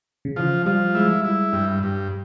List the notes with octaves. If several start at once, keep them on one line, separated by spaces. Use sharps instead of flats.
C#3
E3 F3
F3 G3
G#3 E4
G3 E4
G2 G3
G2